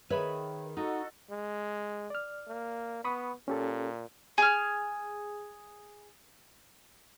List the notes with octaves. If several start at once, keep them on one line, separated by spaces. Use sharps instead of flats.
D#3 G#4 B4 C#5 E5 B5
D#4 F#4 A4 D#5
G#3
D5 F6
A#3
B3 B5 C#6 D#6
A#2 C#4 G4 A4
G#4 F6